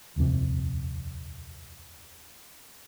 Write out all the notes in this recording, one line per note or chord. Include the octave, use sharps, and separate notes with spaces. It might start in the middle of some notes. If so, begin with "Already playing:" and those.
D#1 C2 F2 C3